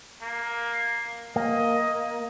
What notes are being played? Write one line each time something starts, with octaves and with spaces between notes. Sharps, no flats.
A#3
A#3 D#5